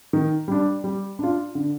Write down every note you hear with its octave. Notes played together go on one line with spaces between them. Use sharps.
D#3
G3 D4
G3
D4 F4
D3